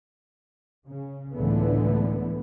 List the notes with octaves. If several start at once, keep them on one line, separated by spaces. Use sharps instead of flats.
C#3
C#2 A2 D3 E3 A3 B3